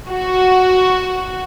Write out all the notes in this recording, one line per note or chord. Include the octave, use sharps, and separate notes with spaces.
F#4